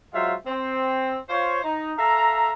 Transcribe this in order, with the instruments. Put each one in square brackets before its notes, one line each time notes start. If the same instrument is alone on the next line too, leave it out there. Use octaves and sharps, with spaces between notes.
[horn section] F#3 G#3 F4 C5 E5 F5
C4
F4 C5 C#5
D#4
A4 E5 F5 A#5